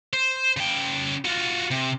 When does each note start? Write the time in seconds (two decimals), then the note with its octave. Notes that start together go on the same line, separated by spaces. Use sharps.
0.13 C5
0.57 C#3 G5
1.25 F4 F#4
1.71 C3